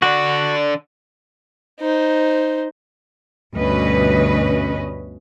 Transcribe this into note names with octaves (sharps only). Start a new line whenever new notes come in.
D3 F#4 D5
D#4 C5
D2 G2 B2 C#4 B4 D#5